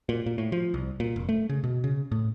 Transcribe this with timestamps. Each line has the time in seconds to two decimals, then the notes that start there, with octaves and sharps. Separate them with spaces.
0.09 A#2
0.26 A#2
0.38 A2
0.52 F3
0.74 C2
1.00 A#2
1.16 F1
1.29 A3
1.49 C#3
1.64 B2
1.84 C#3
2.12 A2